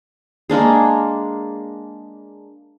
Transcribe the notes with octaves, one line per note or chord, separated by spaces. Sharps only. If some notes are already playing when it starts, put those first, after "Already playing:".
G#3 A#3 D4 G#4